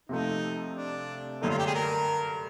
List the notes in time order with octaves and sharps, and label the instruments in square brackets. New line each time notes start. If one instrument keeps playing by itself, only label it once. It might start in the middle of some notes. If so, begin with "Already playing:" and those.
[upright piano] C3 F3 A3 [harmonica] D#4
[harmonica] D4
[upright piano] G2 D3 F#3 A3 [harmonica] D#4
[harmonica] F4
G4
G#4
A#4